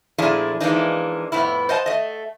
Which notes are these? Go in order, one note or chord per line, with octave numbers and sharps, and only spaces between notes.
A#2 F3 A3 D4 E4 G#4
E3 F3 G#3 A#3 D4 D#4
F2 A2 B3 E4
C5 D#5 F#5 A5
A3 D#5